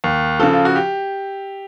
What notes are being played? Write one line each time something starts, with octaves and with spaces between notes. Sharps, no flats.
D#2
C#3 F3 A4
F4
F#4
G4